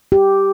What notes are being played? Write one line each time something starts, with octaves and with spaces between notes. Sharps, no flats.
G4